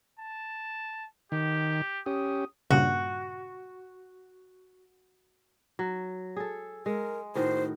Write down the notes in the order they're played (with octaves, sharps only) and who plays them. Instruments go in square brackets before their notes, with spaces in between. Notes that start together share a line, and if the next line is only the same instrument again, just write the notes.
[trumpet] A5
[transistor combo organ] D#3 [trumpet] G4
[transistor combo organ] C#4 G4 [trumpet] D#6
[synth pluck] G2 A#2 C#3 [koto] F#4
[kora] F#3
G#4 A4
[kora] G#3 [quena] A#4
[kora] A2 D#3 F#4 [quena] C5